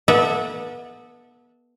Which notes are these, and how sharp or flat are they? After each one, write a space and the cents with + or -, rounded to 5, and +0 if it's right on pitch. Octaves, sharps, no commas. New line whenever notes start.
B3 -30 A4 +0 E5 -35